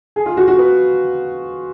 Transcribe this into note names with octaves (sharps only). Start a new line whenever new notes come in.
G#4
F4
F#4
F#4
B4